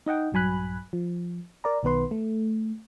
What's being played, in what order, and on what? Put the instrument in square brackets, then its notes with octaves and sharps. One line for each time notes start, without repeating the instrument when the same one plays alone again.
[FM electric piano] D#4 D#5 F#5 G5
A#1 G2 F#3 G#5 B5 F#6
F3
A#4 D5 A#5
B1 D#3 B3 B4 C6
A3